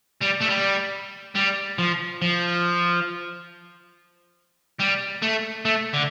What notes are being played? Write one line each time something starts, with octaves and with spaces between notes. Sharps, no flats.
G3
A3
G3
G3
F3
F3
G3
A3
A3
D3